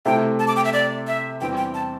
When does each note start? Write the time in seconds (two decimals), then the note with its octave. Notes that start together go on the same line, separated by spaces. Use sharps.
0.06 C3 A3 E4 C5 G5
0.39 A5
0.48 D6
0.56 G5
0.65 E5
0.73 D5
1.07 E5
1.41 E2 E3 G3 C4 G5
1.57 G5
1.74 A5